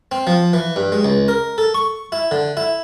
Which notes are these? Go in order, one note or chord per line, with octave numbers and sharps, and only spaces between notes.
C4
F3
E3
G2
G#3
C#2
A#4
A4
C#6
E4
D3
E4